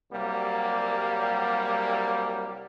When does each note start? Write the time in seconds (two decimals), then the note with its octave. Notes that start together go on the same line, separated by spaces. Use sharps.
0.11 C2 F#3 G3 A#3